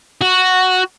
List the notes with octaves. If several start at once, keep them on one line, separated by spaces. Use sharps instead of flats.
F#4